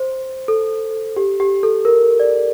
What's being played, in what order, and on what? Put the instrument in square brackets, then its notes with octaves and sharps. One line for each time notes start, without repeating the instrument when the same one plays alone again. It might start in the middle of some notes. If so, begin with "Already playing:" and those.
Already playing: [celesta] C5
A4
G4
G4
A4
A#4
D5